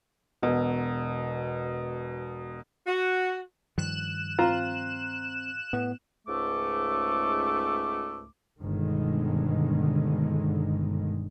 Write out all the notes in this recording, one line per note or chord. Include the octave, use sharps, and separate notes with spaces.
E1 B2
F#4
G2 D#3 F3 F#6 E7
C4 F4 A#5
A2 B3
C#2 G#2 A3 D6
G1 B2 D3 D#3 G#3